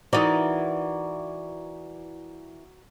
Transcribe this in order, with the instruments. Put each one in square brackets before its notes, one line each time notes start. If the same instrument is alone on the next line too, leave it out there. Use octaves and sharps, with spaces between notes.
[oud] E3 D#4 [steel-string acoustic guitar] F#4 A#4 D5